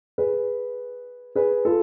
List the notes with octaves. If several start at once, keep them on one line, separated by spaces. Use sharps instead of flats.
G#4 B4
G#4 B4
F4 A4